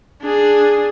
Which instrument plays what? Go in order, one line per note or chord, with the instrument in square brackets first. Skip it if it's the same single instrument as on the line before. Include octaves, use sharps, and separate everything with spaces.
[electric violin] D4 G#4